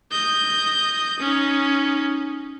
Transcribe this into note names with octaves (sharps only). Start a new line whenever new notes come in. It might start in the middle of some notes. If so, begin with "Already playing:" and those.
D#5 G6
C#4 D#4